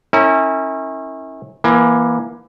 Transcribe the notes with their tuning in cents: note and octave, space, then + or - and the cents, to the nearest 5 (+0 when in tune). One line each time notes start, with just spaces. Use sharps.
C#4 -25 E4 -35 A#4 -45
E3 +15 A#3 +30